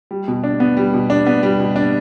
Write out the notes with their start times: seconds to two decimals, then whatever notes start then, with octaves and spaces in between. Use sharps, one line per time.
0.11 G3
0.28 B2
0.44 D4
0.60 B3
0.77 G3
0.94 B2
1.10 D4
1.26 B3
1.43 G3
1.59 B2
1.76 D4